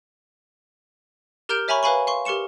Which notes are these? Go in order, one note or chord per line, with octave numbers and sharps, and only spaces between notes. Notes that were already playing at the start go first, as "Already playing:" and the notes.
G4 A#4 A#5 F6 G6 D7
C#5 E5 G#5 A#5 B5 C#6
B4 C#5 F5 G#5 B5 C#6
F5 C6 C#6
G4 A#4 C#6 C#7 E7